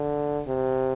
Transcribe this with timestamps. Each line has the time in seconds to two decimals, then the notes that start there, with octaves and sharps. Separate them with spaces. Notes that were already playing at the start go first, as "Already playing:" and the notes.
Already playing: D3
0.47 C3